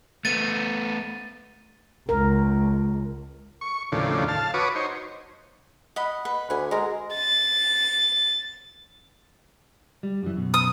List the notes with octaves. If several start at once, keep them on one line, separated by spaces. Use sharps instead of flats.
A3 B3 A6 D#7
C#2 A#4
C#6
D#2 A2 C#3 F3 D4
F5 A5
F#4 B4 C#5 D6 D#6
D#4 C5 C#5
D#5 F#5 B5
B4
D2 F#5 G#5
G#3 A#4 A#5
A6
G3
F#2 E3
F#2 B2
D#6